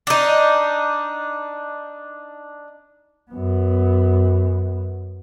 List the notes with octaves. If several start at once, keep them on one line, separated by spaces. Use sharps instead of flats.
D4 D#4
F#2 B3